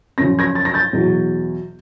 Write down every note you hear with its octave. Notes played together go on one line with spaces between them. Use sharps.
F#2 C#3 F3 A#6
G#6 A#6
A6
A#6
G6 A6
E2 B2 F#3